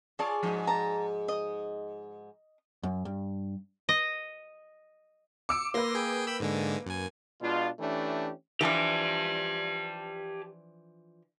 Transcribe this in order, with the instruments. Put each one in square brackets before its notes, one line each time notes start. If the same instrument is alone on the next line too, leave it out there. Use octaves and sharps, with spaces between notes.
[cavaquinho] F4 C#5 A5 [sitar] G#4 D5
[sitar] G#2 F3
[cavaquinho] A5 A#5
D#5 D#6
[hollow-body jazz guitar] F#2
G2
[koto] D#5
[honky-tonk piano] D6 E6 D7 [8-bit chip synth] C#7
[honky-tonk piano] A#3 B4 [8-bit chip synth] C6 A#6
[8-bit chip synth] G#4 G5
G5 B5 E6
G#2 D3 G#3
F#2 G#5
[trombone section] B2 G#3 D4 F4
E3 A3 C#4 D4 G4
[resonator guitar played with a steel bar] E3 F3 D4 [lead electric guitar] G4 A5